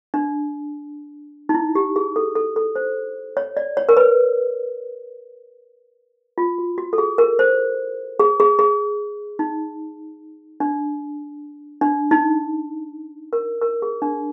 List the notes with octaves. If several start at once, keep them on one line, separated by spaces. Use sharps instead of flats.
D4
D#4
E4
G4
G#4
A4
A4
A4
C5
C#5
D5
C#5
A#4
B4
F4
F#4
F#4
A4
G#4
A#4
C5
G#4
G#4
G#4
D#4
D4
D4
D#4
A#4
A#4
G#4
D4